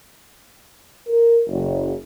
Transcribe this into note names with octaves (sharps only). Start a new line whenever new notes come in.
A#4
F#1